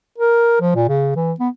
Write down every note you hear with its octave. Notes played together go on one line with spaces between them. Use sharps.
A#4
F3
A#2
C#3
E3
B3